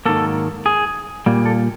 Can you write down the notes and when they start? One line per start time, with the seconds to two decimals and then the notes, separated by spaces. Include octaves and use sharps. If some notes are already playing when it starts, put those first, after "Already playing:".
0.05 G#2 D#3 F#3 A#3 A4
0.66 G#4
1.26 A#2 G3 A#3
1.46 A4